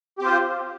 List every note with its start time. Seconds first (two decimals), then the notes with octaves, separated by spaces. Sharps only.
0.19 G4
0.21 C4
0.24 F4
0.26 C5